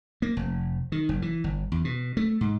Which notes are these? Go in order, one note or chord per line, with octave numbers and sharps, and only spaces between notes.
A#3
F1
D#3
F#1
E3
G1
E2
B2
A3
G#2